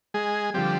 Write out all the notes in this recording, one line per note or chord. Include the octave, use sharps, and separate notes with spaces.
G#3 G#4
D3 F3 G3 C4 G4